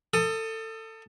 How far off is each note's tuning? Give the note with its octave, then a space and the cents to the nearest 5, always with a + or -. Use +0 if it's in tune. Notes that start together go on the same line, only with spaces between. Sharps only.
A4 +25 D#6 +0